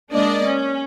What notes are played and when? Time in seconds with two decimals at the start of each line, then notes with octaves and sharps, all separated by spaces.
0.12 G#3 A#3 D4 D5 D#5
0.46 C#4